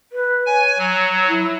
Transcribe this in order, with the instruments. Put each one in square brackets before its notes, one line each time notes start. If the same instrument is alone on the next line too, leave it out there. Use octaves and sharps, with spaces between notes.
[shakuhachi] B4
[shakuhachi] C#5 [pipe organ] G#5
[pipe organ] F#3
[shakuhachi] E4